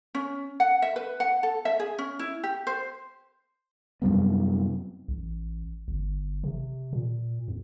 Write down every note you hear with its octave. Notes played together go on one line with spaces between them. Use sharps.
C#4
F#5
E5
B4
F#5
A4
E5
G#4
C#4
E4
G4
C5
F#2 C3 G3 B3
A1
G1
C3
A#2
E2